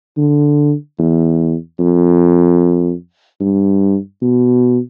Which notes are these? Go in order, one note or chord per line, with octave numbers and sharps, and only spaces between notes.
D3
E2
F2
G2
B2